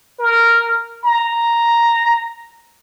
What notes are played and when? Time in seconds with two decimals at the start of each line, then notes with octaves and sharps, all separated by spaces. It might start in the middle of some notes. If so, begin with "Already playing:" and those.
0.19 A#4
1.04 A#5